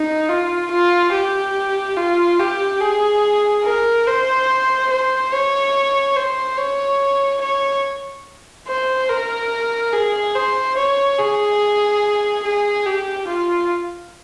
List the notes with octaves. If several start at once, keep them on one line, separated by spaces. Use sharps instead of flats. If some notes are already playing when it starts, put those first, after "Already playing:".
Already playing: D#4
F4
F4
G4
F4
G4
G#4
A#4
C5
C5
C#5
C5
C#5
C#5
C5
A#4
G#4
C5
C#5
G#4
G#4
G4
F4